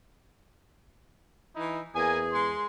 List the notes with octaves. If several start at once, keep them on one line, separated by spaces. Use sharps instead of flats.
E3 D#4 E4
E2 A#3 G#4 G#5
G#3 C6